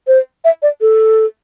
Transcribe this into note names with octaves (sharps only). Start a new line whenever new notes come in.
C5
E5
D5
A4